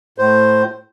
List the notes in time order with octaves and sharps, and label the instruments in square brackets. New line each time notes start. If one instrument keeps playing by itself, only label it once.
[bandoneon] A2 C5